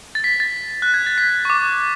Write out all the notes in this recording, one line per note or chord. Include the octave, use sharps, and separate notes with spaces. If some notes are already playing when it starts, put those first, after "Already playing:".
A6
B6
A6
F#6
G#6
A6
B6
C#6
D6